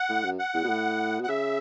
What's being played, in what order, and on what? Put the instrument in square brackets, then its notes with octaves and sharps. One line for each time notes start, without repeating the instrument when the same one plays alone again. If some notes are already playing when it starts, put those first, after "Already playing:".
Already playing: [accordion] F#5
[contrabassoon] A2
F#2
[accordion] F#5
[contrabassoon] E2
B2
A2
B2
[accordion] F#5
[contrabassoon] C#3 [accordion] E5